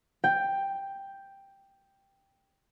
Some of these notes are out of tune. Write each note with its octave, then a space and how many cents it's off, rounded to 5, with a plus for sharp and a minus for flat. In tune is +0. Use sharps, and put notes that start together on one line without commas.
G5 +5